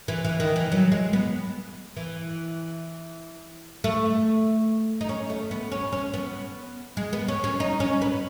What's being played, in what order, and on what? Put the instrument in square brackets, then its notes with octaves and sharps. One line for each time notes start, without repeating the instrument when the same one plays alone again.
[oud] E3
E3
D#3
E3
F#3
G#3
B3
E3
A3
D#4
C#4
A3
B3
C#4
C#4
B3
G#3
B3
C#4
C#4
D#4
C#4
B3